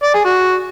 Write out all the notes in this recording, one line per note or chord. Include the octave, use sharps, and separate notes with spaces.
D5
G#4
F#4